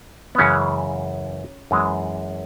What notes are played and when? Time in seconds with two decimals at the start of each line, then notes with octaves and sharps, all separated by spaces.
0.35 B3
0.38 F#2 C#3 E3 G#3 C#4
1.71 F#2 E3 G#3